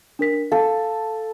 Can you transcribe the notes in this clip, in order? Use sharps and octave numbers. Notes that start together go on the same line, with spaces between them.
D4 A#4 B6
A4 F5